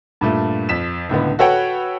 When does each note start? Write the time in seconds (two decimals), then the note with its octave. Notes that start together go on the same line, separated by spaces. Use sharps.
0.21 G2 A#2 A3
0.69 F2 B6 E7
1.09 C#2 A2 D3 B3
1.39 F#4 A4 B4 C#5 F#5 G5